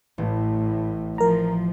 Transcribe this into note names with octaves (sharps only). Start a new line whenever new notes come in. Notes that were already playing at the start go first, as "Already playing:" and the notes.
A1 A2
F3 A#4 A#5